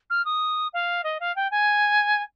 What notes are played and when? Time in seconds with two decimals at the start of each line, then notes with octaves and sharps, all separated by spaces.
0.10 F6
0.25 D#6
0.73 F5
1.03 D#5
1.20 F5
1.36 G5
1.51 G#5